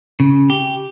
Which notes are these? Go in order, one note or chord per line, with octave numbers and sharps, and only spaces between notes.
C#3
G4